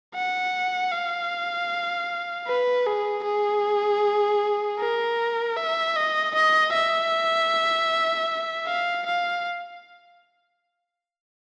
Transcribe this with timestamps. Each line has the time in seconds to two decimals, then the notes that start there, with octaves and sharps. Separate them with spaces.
0.14 F#5
0.92 F5
2.47 B4
2.86 G#4
3.24 G#4
4.79 A#4
5.57 E5
5.96 D#5
6.35 D#5
6.73 E5
8.67 F5
9.06 F5